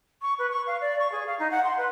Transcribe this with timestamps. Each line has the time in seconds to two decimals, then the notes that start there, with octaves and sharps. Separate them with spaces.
0.22 C#6
0.39 B4
0.51 C#6
0.67 F5
0.81 D5
0.99 C#6
1.12 G#4
1.27 F5
1.39 D#4
1.51 F#5
1.64 C6
1.78 B4